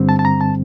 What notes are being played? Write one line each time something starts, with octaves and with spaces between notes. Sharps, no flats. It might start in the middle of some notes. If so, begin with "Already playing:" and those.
Already playing: G2 D3 G3 C4
A5
A5
A#5
A5